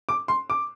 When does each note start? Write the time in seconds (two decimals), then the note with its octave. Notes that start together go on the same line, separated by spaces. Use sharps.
0.09 D6
0.28 C6
0.50 D6